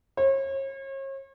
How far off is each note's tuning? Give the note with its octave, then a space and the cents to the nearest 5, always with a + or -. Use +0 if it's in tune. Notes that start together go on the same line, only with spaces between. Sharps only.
C#5 -40